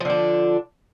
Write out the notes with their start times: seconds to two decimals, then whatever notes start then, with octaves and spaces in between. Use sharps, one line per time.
0.01 F3
0.05 D3
0.10 D4